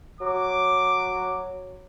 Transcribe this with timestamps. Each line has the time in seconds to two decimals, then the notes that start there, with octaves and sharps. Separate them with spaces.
0.21 F#3 D6